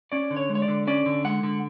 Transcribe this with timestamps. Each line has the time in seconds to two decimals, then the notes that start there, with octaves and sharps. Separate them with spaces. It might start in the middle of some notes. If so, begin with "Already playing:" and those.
0.12 C#4 D5
0.31 D3
0.37 C#5
0.49 G#3
0.55 C#5
0.62 D5
0.68 D3
0.87 C#4 D5
1.06 D3
1.24 G#3 F#5
1.43 D3